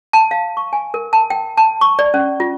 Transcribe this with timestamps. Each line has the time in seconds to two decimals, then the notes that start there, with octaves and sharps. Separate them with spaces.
0.13 A5
0.31 F5
0.57 C#6
0.73 G#5
0.94 A#4
1.13 A5
1.30 G5
1.58 A5
1.81 C#6
1.99 D5
2.14 C#4
2.40 F4